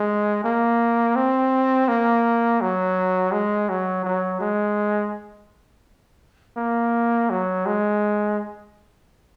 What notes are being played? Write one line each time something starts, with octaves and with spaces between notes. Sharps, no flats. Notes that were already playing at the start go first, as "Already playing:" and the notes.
Already playing: G#3
A#3
C4
A#3
F#3
G#3
F#3
F#3
G#3
A#3
F#3
G#3